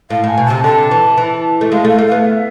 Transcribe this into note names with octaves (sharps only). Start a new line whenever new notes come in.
A2 F5
A2
G#5
B2
C3 A5
D3 A5
E3
E3
A3
G#3 F5
A3 F5
A3
F5
B3
E5